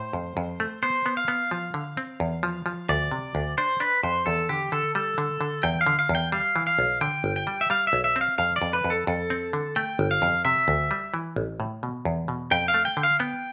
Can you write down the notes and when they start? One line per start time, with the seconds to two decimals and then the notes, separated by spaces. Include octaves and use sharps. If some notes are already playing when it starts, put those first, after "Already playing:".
Already playing: A2 C5
0.13 F2
0.37 F2
0.60 A3
0.83 B3 C5
1.06 B3
1.17 F5
1.28 B3
1.51 F3
1.74 D3
1.97 C4
2.20 E2
2.43 F3
2.66 F3
2.89 D2 D5
3.11 C3
3.35 D2
3.58 D4 C5
3.80 D4 B4
4.03 F2 C5
4.26 E2 A4
4.49 D3 G4
4.72 D3 A4
4.95 G3 A4
5.18 D3
5.41 D3
5.63 E2 G5
5.81 F5
5.87 D3
5.99 F5
6.09 E2
6.15 G5
6.32 G3 F5
6.56 E3
6.67 F5
6.79 B1
7.01 D3 G5
7.24 G1
7.36 G5
7.47 G3
7.61 E5
7.70 G3 F5
7.87 E5
7.93 B1
8.04 E5
8.16 C4
8.21 F5
8.38 F2 F5
8.56 D5
8.62 F2
8.73 B4
8.84 F2
8.90 A4
9.07 F2 A4
9.30 C4
9.53 D3
9.76 A3 G5
9.99 G1
10.11 F5
10.22 F2
10.45 C3 E5
10.68 D2
10.91 G3
11.14 E3
11.36 A1
11.60 A2
11.83 B2
12.05 E2
12.28 B2
12.51 F2 G5
12.68 F5
12.74 A3
12.85 G5
12.97 D3
13.03 F5
13.19 B3 G5